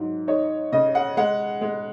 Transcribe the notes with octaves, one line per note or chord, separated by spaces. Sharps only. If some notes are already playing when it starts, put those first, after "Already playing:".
Already playing: G#2 F#3
D#4 C#5
C#3 D#5
F#5
G#3 F#5
G#3